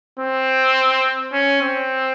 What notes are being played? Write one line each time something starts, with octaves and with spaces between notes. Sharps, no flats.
C4
C#4
C4